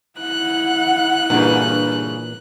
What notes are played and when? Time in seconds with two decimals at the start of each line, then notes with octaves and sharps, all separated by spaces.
0.20 E4 F#5 F#6
1.30 G2 A#2 C#3 E3